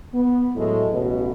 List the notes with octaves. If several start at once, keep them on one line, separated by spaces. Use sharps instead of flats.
B3
A2 F#3 G#3 A3
A1 B2